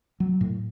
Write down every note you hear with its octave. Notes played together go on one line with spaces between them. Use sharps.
F#3
A2